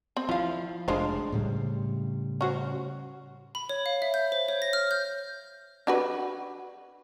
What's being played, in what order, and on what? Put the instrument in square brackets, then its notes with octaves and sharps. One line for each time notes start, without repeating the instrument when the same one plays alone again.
[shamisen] C4
[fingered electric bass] F3 [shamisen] E4 F5
[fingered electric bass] F1 D4 [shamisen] F3 G#3 C5
[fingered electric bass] A2 C#3 G3
[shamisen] C#4 F#4 C5
[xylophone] B5
C#5
F5
E5
G6
C5
C#5
A#6
F6
G6
[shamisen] D4 F#4 B4